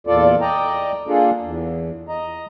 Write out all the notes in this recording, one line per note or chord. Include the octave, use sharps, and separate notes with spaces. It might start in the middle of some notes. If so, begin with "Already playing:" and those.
E2 A#2 F4 A4 D5
D5 D#5 G5 A#5
A#3 D4 F4 G#4 A4
E2
D#5 A#5